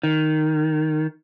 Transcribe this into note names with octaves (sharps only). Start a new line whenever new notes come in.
D#3